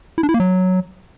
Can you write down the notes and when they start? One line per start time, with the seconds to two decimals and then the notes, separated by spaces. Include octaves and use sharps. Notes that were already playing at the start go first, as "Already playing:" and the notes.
0.18 E4
0.23 D4
0.29 E4
0.34 A#3
0.40 F#3